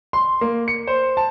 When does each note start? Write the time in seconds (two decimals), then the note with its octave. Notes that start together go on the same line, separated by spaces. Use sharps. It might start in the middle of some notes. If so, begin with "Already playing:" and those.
0.13 C6
0.41 A#3
0.68 C#7
0.87 C5
1.17 A5